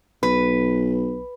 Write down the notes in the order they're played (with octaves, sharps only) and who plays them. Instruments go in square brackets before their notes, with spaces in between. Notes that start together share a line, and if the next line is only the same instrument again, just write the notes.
[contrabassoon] B1 [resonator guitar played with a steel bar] B4